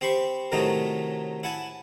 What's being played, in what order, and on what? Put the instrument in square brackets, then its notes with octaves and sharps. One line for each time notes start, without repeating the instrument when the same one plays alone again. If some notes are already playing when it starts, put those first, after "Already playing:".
[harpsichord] C4 G4 C5 B5 C#6
A2 C3 D#3 F#3 A3 D#4
E4 F#5 G#5 A5